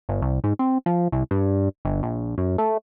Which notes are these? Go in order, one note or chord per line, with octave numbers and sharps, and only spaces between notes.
G1
C2
G#2
C4
F3
C2
G2
G1
A#1
F#2
A3